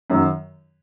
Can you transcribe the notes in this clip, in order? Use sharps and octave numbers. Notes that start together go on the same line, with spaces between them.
F#2 D#3 F#3